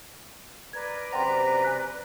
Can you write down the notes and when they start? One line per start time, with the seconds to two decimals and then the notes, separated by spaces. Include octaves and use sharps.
0.73 A#4 B4 D5 G#6
1.13 F#2 C3 C5 F#5 G5 A#5 C6
1.62 G#5 F#6 B6